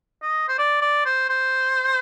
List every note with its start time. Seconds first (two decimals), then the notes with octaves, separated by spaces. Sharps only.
0.22 D#5
0.49 C5
0.58 D5
0.82 D5
1.06 C5
1.29 C5